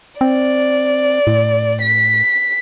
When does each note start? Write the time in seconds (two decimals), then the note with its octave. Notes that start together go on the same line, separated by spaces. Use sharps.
0.21 C4 D5
1.27 A2
1.82 B6